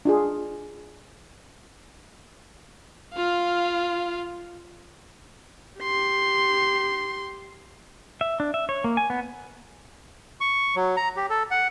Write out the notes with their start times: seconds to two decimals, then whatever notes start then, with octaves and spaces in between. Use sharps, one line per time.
0.05 D4 F4 G#4
3.14 F4 F5
5.81 G4 C6
8.21 E5
8.40 D4
8.54 E5
8.69 C#5
8.84 A#3
8.97 G#5
9.10 B3
10.41 C#6
10.76 F#3
10.97 A#5
11.16 G4
11.30 A4
11.51 F#5